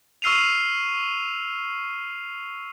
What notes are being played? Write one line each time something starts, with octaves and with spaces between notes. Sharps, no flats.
C#6 E6 F6 C7 D#7 F7